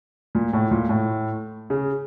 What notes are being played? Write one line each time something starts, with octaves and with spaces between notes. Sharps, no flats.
A#2
A2
A#2
A2
C#3